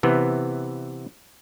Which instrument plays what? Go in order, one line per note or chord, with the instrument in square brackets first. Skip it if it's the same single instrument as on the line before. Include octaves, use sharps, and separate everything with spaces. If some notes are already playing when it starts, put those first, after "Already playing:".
[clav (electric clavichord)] C3 E3 B3